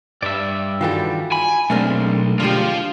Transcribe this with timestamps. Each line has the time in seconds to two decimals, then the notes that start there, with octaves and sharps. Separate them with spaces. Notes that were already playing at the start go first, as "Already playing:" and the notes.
0.23 G2 D5 E5
0.81 D#3 E3 G3 F4 F#4 A4
1.32 G#5 B5
1.70 B1 G#3 A3 C4 D4 A#4
2.40 D3 F3 G#3 F4 G4